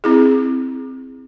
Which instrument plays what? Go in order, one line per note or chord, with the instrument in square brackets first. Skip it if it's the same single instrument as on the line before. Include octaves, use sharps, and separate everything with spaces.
[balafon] C4 E4 G#4